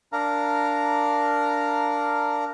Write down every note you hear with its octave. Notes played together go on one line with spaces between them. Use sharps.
D4 A#4 F5 A#5